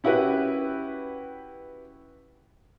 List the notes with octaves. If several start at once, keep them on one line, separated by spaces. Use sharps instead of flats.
C#4 E4 F#4 G4 B4